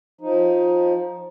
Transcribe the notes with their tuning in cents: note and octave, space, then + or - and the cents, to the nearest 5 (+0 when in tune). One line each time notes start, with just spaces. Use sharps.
F3 +20 D#4 +10